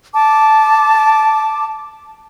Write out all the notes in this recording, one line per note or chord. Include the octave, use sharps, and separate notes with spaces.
A5 D6